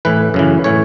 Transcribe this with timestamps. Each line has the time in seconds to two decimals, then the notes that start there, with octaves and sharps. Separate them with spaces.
0.05 A2 E3 B4
0.34 F#2 C#3 E3
0.64 A2 E3 C#5